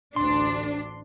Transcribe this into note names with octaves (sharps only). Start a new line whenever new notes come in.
A1 D2 D4 C6